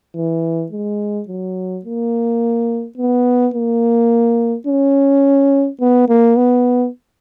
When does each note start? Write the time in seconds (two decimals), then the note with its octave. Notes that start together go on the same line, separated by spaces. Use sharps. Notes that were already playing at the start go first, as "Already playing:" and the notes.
0.15 E3
0.72 G#3
1.29 F#3
1.85 A#3
2.98 B3
3.55 A#3
4.67 C#4
5.81 B3
6.09 A#3
6.37 B3